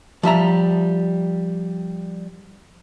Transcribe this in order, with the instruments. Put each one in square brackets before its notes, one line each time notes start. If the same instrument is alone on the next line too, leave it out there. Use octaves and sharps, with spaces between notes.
[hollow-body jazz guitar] F3 G3 E5 A#5